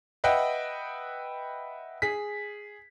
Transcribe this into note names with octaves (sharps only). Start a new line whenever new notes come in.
B4 D#5 E5 F#5 G5
G#4 B6